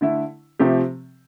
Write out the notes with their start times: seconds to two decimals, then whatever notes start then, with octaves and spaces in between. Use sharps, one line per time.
0.01 D3 A3 E4
0.59 C3 F3 A3 C4 G4